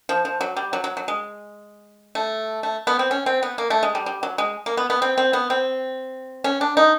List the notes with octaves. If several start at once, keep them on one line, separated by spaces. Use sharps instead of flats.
F3
F3
F#3
G3
F#3
F#3
F#3
G#3
A3
A3
B3
C4
C#4
C4
B3
A#3
A3
G#3
G3
G3
F#3
G#3
A#3
B3
B3
C4
C4
B3
C4
C#4
D4
D#4